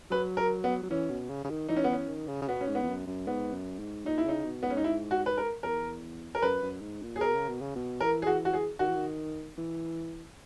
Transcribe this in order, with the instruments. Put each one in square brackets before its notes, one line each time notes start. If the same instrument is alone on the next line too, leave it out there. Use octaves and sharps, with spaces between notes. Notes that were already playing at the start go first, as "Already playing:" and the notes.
[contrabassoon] F#3 [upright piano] B4
[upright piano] A#4
B3
[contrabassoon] F#3
[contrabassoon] E3 [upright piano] C#4
[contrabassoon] B2
C#3
C#3
D#3
[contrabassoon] E3 [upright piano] D#4
[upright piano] C#4
B3
[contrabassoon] E3 [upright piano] C#4
[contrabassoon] D#3
C#3
C#3
[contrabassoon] B2 [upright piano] B3
[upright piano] C#4
[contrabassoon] G#2
[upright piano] B3
[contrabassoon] E2
F#2
F#2
[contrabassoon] G#2 [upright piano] B3
[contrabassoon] F#2
G#2
[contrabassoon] A#2 [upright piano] D#4
[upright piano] E4
[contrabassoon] C#3 [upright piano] D#4
[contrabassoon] B2
[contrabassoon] G#2 [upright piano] B3
[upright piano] C#4
D#4
E4
F#4
B4
A#4
[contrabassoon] E2 [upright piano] A#4
[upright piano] A#4
[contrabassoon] F#2 [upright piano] B4
[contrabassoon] F#2
G#2
A#2
[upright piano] G#4
[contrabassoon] B2 [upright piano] A#4
[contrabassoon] C#3
B2
C#3
B2
[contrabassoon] E3 [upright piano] A#4
[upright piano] G#4
F#4
F#4
G#4
[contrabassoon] D#3 [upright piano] F#4
[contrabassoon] E3
D#3
E3